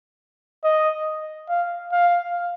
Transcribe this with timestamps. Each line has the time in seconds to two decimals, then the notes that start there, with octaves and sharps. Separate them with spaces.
0.64 D#5
1.49 F5
1.92 F5